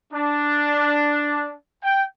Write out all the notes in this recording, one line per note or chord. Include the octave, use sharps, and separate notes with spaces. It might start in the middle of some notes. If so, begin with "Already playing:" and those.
D4
G5